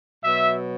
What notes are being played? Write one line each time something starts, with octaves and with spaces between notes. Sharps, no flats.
B2 F#3 E5